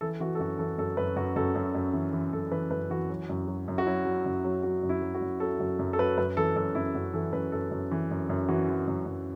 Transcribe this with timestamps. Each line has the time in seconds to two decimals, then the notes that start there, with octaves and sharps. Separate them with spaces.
0.01 E3 A4
0.20 E3 F#4
0.35 A4
0.39 F#2 F#4
0.59 E3 A4
0.78 F#2 A4
0.97 F#2 B4
1.16 F#2 F#4
1.36 F#2 A4
1.55 F#2
1.75 F#2
1.93 E3
2.13 E3
2.33 F#2 A4
2.52 E3 B4
2.71 F#2 B4
2.90 E3 F#4
3.09 F#3
3.29 F#2
3.47 F#3
3.68 F#2
3.78 F#4
3.86 F#3 E4
4.05 F#3
4.26 F#2
4.44 F#3
4.63 F#3 F#4
4.83 F#2
4.89 E4
5.02 F#3
5.14 F#4
5.22 F#2
5.40 F#3 A4
5.60 F#2 F#4
5.79 F#2
5.93 A4
5.98 F#3 B4
6.17 F#2 B4
6.37 E3 A4
6.56 F#2 A4
6.75 F#2 E4
6.95 F#2 F#4
7.14 E3 A4
7.33 F#2 B4
7.52 F#2 A4
7.71 F#2
7.91 E3
8.11 F#2
8.29 F#2
8.48 E3 F#4
8.69 E3
8.88 F#2
9.06 F#2